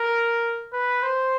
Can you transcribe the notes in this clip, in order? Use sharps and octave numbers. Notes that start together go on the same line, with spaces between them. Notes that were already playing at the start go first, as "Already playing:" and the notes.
Already playing: A#4
B4
C5